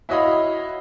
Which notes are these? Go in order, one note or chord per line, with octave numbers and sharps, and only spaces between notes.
E4 F#4 C#5 D#5 F5 B5